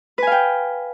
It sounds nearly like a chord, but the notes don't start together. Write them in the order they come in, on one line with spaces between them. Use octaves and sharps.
B4 G#5 F5 G5